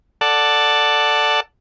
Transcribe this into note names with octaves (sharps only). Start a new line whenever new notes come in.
A4 D5 F#5 A5